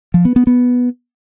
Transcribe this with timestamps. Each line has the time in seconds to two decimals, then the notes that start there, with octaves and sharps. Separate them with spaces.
0.14 F3
0.25 B3
0.36 B3
0.47 B3